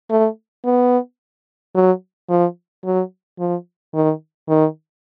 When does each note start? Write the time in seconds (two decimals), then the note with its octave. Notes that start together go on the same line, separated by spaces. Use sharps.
0.11 A3
0.65 B3
1.75 F#3
2.30 F3
2.85 F#3
3.40 F3
3.95 D#3
4.49 D#3